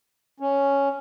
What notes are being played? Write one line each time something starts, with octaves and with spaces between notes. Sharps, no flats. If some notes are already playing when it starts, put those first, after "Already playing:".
C#4